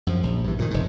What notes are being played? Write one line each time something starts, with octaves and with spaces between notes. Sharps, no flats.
F#2 F3
A#1
G2 E3
G2 A#2 D#3
F1 G#2